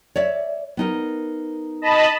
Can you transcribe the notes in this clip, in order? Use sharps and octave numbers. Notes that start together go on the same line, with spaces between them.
C#5 D5 E5
B3 D#4 A#4
D#5 A5 B5